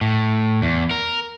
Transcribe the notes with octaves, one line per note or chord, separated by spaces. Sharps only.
A2
E2
A#4